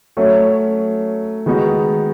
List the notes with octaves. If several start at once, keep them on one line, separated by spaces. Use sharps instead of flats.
F#3 A3 C#4
D#3 G#3 B3 D#4 F#4